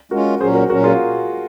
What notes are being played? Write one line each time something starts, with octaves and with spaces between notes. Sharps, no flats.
G#3 C#4 F4 F#4 A#4
A#2 F#3 C#4 G#4 C5
F#4 A#4
A#2 F#3 C#4 F#4 A#4
F4 G#4